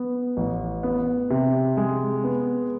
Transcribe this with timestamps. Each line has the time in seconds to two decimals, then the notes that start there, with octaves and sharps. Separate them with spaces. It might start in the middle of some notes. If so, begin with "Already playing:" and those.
Already playing: B3
0.37 A1
0.83 B3
1.30 C3
1.77 G#3
2.24 B3